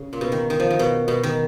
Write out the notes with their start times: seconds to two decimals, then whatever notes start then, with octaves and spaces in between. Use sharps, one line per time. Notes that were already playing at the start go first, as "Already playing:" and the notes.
Already playing: C#3
0.13 A#2
0.21 B2
0.32 D#3
0.50 D#3
0.60 F3
0.70 D#3
0.79 B2
1.08 B2
1.23 D#3